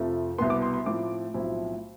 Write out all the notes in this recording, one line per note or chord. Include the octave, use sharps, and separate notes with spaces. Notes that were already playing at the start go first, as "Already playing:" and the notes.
Already playing: F2 C3 F3 A3
C2 B2 B3 C6
D6
C6
C6
A2 F3 C4 E4 D6
B1 A2 F3 C4 E4